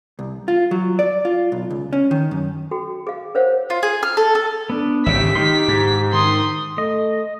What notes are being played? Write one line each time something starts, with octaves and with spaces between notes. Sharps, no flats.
C2
F4
F#3
D5
F4
B1
C#2
C#4
D#3
F#2
F#4 A4 G5
G#4 F5
A#4 C5 C#5 F5 F#5
F4
G#4
F6
A4
A4
B3 D4
G#1 C#3 G4 E5 B6
D#3 G4 C6
G#2
D#3 C6 D#6
A3 D#5